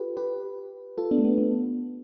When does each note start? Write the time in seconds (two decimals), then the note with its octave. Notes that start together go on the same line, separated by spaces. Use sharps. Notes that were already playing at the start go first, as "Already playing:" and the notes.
Already playing: F4 G4 A4 B4
0.17 G4 B4
0.98 F4 A4
1.11 B3 D4
1.18 A3
1.24 B3
1.38 B3